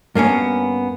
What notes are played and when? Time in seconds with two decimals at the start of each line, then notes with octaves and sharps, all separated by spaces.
0.15 G2 A#3 B3 C#4